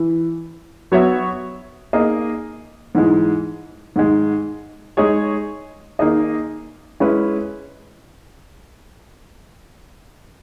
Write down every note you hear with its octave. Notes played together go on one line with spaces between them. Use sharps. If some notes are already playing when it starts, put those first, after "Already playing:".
Already playing: E3
F#3 B3 F#4 C#5 E5
A#3 D#4 G#4 D#5
G#2 E3 G#3
G#2 D#3 G#3
G#3 D#4 G#4 C#5
D#3 A#3 D#4 G#4 D#5
G#3 C#4 E4 B4